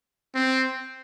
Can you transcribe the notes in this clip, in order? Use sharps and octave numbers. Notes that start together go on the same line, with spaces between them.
C4